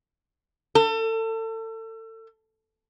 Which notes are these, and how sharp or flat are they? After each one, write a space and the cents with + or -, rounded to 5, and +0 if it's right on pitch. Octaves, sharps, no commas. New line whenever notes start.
A4 +30